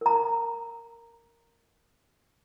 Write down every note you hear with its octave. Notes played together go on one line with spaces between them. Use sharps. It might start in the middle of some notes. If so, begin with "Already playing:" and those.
A#4 A#5